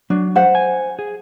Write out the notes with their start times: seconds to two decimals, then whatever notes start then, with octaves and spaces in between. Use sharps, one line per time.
0.10 F#3 D4
0.35 C5 F#5
0.55 G#5
0.99 G#4